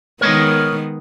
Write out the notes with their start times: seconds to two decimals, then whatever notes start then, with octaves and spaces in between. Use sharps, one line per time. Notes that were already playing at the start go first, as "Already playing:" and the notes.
0.21 D#3 G#3 B3 A#4 C#5 D#5